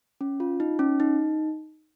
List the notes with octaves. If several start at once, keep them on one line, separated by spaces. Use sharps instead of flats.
C#4
F4
D#4
C#4
D#4